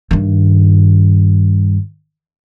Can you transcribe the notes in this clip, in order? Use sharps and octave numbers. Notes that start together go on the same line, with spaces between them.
G2 D#3